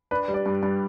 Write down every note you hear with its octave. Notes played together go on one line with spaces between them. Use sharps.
D4 B4
G3
D5
G2
G2